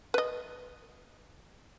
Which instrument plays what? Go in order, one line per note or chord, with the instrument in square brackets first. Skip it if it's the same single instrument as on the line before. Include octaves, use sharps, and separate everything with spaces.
[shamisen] B4 D#5